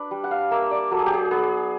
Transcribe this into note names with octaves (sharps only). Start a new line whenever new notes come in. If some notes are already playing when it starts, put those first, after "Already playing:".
Already playing: D4 B4
G3
F#5
F5
A#3 E5
D5
F#3 A4
G#4
G4
G#4
B3 G#4